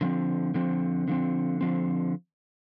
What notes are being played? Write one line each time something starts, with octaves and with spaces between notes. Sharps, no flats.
D3 F3 C4
D3 F3 C4
D3 F3 C4
D3 F3 C4